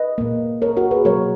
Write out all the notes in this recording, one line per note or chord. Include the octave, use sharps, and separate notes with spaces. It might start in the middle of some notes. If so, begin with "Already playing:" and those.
Already playing: B4 D#5
A#2 A#3
A#4 C#5
F#4 A#4
G#4 B4
B2 F#3 A#3 A#4 C#5